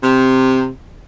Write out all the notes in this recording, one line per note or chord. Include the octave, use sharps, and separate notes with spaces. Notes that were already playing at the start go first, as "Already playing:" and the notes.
C3